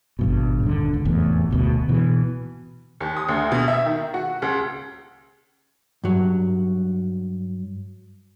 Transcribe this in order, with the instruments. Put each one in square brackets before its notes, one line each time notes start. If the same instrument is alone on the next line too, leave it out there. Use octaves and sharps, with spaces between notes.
[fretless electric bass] G#1 G2 B2
D#1 D3
C#2
F1 E2 A2
E1 D2 B2
B2 E3
[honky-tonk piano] D#2
D#6
D2
B2
E5
D#3
F#4
C#2
[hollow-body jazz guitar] G2 F#3